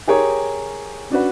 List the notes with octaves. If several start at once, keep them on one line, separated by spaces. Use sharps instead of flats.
G4 G#4 A#4 C#5
C#4 D4 F#4 B4